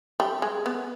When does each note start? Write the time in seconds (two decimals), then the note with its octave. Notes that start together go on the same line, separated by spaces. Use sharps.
0.20 G3
0.42 G#3
0.66 B3